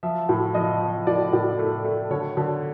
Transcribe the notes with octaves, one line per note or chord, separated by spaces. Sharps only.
F3 E5
A2
F3 D#5
F3
A2 D5
A2
A3
A3
D3 C#5
D3